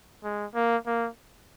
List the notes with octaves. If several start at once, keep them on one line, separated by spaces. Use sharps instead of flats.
G#3
A#3
A#3